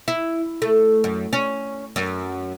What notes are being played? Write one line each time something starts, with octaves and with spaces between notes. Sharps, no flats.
E4
A3
F#2
C#4
F#2